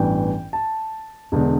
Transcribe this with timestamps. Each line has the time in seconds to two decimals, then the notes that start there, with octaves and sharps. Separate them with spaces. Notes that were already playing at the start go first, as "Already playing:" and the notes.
Already playing: A1 G2 E3 B3 G5
0.53 A5
1.32 E1 E2 D3